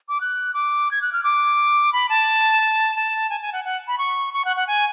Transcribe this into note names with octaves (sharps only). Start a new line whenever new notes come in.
D6
F#6
D6
G#6
F#6
F6
D6
B5
A5
A5
G#5
G#5
F#5
F#5
B5
C#6
C#6
F#5
F#5
G#5